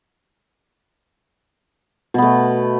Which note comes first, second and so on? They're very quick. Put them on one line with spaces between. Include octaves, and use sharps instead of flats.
B2 B3 A3